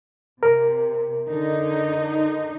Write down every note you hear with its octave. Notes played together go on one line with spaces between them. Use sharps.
C3 A#4
D3 D#4